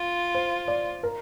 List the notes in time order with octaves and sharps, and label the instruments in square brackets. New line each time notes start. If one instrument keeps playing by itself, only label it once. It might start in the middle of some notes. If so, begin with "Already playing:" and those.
Already playing: [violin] F4
[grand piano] C5
D5
A#4